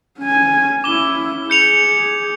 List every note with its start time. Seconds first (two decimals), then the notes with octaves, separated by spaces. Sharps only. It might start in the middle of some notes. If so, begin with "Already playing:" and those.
0.19 C#4 G#5
0.84 C#4 E4 D6 G7
1.50 G#4 G6 C#7 F7